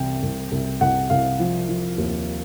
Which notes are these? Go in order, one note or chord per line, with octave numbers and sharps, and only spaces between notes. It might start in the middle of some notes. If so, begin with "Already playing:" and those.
Already playing: C2 C3 E3 G5
C2
C2
C2 F#5
C2 F5
F3
F3
D#2